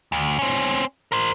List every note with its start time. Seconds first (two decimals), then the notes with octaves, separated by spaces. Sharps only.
0.12 D2
0.39 C4 C#4
1.12 A#4 C5